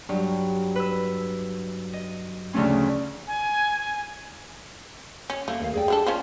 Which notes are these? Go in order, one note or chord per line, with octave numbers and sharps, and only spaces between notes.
G2 F#3
B4 E6
D#5
D2 C#3 F3 A3 C#4 C6
G#5
C#4
A3 A#3
D#2 F5
G#4 D5 G5
G3 D4 A4
C#4 F4 C5